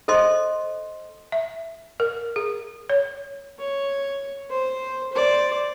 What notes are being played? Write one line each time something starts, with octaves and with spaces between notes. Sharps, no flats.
A4 C5 D#5 C6
E5
A#4
G#4
C#5
C#5
C5
C5 D5